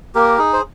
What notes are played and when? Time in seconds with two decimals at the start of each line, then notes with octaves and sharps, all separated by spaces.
0.15 A#3 G4 A#4
0.38 D#4 G#4
0.53 C5